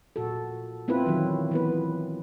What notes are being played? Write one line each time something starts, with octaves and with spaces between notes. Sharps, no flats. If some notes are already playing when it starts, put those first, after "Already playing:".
A#2 F#4 A4
B3 C4 E4 F4 B4
D#3 E3 F#3
E3 B3 B4